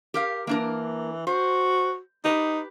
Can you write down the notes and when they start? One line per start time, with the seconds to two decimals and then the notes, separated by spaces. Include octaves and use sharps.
0.14 G4 A#4 F5
0.47 E3 A#3 D4 A#4
1.27 F#4 C5
2.24 D#4 G4 B4